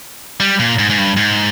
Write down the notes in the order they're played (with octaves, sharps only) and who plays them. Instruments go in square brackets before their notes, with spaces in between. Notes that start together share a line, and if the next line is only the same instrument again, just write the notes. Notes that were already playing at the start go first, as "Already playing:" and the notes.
[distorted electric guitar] G3
A#2
G#2
G#2
G2
G#2